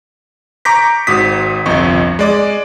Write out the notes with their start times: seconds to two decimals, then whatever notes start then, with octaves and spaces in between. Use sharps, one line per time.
0.65 A#5 C#6 D6 G6 A#6 B6
1.07 G#1 G#2 F#4 D#6 B6
1.66 G1 C2 F2 D#5 C#6
2.19 G#3 D5 D6